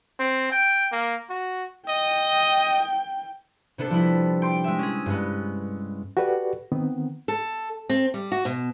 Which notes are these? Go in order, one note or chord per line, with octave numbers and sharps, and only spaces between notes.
C4
G5
A#3
F#4
D#5 G5
C3 B3 D4 A4
F3 G3 E4
G5 C6 D6
G#3 E5
C#4 G#4
G2 G#3 B3
F#4 G4 A4 B4 D5
D#3 B3 C4
A4
C4
G3
F#4
B2